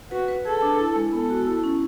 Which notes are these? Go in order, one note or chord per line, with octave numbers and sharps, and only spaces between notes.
F#4 B4
B4
G#4 A4
D4
E4
G#3
B3 A4
F#4
E4
C#4